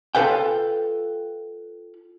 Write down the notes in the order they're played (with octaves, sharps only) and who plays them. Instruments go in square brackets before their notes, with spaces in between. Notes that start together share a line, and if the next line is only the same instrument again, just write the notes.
[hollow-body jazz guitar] F4 F#4 A4 B4 F5 G5